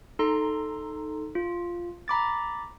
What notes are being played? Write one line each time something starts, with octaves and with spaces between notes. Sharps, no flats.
D#4 A4 A#5 C6
F4
A#5 B5 D6 A6